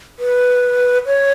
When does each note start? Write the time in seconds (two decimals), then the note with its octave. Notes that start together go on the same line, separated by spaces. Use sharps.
0.19 B4
1.06 C#5